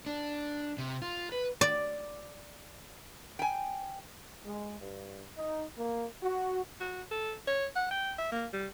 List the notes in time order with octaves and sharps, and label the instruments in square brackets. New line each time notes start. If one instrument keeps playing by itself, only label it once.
[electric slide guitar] D4
C3
F4
B4
[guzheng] D5
[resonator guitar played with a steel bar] G5 G#5
[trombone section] G#3
G2
D#4
A#3
F#4
[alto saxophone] F#4
A4
C#5
F#5
G5
E5
A#3
G3